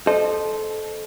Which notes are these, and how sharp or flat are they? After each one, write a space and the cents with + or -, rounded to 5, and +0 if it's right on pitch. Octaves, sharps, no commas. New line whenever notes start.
A4 -20 C5 +0 D#5 -30